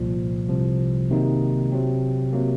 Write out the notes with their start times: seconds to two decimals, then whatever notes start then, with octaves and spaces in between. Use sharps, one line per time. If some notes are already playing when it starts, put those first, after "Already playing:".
Already playing: C2 A#2 F3
0.48 C2 C3 F3
1.11 C3 D#3 F#3 A#3 D#4
1.72 C3 F#3 C4
2.33 C3 F#3 A#3